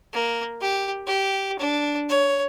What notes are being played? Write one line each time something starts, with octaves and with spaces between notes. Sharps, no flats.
A#3
G4
G4
D4
C#5